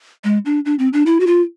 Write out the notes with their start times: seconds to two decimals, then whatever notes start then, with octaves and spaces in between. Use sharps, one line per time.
0.24 G#3
0.45 D4
0.65 D4
0.79 C4
0.93 D4
1.06 E4
1.20 F#4
1.27 F4